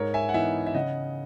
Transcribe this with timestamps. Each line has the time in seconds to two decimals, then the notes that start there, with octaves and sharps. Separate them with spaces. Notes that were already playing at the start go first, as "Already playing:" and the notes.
Already playing: G#2 A#4 C#5
0.14 E5 G#5
0.29 F#5
0.34 E3 B3 D#4 E5 G#5
0.66 E5
0.74 C#3 D#5 F#5